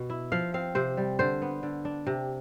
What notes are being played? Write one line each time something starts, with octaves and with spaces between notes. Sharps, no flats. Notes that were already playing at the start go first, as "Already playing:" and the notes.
Already playing: B2
E4
F3 F5
C4 F5
C3 C5
G3
D3 C5
B3
D3
D4
C3